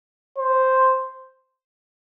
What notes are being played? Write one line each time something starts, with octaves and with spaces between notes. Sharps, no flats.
C5